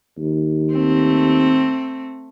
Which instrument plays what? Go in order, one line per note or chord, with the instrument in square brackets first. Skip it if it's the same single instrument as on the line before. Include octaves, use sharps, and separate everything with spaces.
[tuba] D#2
[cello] A3 C4